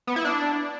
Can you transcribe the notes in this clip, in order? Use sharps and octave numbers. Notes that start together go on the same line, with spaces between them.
B3
E4
D4